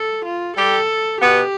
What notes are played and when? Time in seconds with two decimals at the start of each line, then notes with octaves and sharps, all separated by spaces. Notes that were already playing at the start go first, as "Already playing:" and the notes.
Already playing: A4
0.25 F4
0.57 G3 G4 A4
1.22 B2 B3 G4